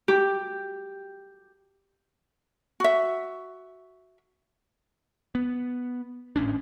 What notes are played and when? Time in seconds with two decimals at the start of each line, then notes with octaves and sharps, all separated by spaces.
0.08 G4
2.80 F#4 E5
5.35 B3
6.36 G#1 A2 C#4 D4